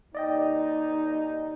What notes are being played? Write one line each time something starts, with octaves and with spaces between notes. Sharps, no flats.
D#2 D#4 D5 D#5 G5